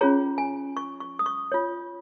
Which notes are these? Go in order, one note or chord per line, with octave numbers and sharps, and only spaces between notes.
C#4 F4 G#4 C#5 A#5
G#5
C#6
C#6
D#6
C#6
F4 C#5